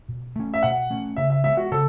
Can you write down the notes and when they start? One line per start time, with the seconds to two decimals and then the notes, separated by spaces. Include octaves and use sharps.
0.09 B2
0.36 A3 C#4
0.54 E5
0.63 B2 F#5
0.90 A3 C#4
1.17 C#3 E5
1.30 E5
1.44 G#3 B3 E5
1.57 F#4
1.71 C#3 A4